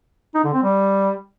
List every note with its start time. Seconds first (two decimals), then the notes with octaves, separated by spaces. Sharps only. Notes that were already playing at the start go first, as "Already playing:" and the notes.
0.35 D#4
0.44 D3
0.54 C4
0.63 G3